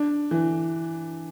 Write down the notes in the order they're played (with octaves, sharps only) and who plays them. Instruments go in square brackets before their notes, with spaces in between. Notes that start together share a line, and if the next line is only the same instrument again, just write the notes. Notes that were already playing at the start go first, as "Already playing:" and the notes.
Already playing: [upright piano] D4
E3